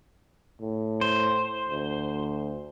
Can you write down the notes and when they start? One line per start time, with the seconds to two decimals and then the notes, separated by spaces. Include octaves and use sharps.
0.61 A2
1.01 C5
1.69 D2